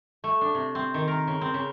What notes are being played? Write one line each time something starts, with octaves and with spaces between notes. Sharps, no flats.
A3
D4
C3
C4
D#3
A#4
C#3
C4
C#3